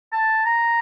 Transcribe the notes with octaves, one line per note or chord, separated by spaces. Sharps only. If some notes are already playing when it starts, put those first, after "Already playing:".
A5
A#5